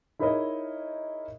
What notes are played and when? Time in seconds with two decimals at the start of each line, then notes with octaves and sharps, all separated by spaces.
0.19 D#4 E4 G#4 A#4 C#5 D#5